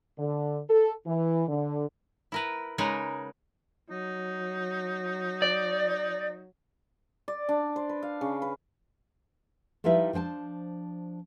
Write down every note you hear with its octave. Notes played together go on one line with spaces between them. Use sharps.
D3
A4
E3
D3
E4 A#4 B4
C#3 G#3 D#4 A#4 B4 C#5
F#3 D#4
D5
D5
D4
C5
B4
F5
C#3
B4
F3 G3 D#4 E4 B4 E5
F3 D4 C5 G5 A5